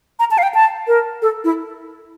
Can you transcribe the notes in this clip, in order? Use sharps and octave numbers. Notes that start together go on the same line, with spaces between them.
A#5
A5
F5
G5
A5
A#4
A4
E4